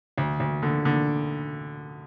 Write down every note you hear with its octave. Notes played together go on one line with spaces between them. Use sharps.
D2
D2
D3
D3